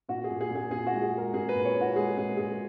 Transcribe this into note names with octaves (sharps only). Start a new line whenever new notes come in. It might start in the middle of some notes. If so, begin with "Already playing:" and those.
A#2 F#4
G#4
A#2
G#4
A#2
G#4
A#2 G#4
F#4
G#3
G#4
G#3 A#4
A#2 G#4
B4
A#2
C#5
A#2
F#4
G#3 G#4
A#2 G#4
A#2 G#4